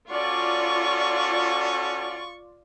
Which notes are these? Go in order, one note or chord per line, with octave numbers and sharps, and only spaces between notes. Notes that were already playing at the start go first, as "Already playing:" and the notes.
C#4 F4 F#4 A4 D5 C#6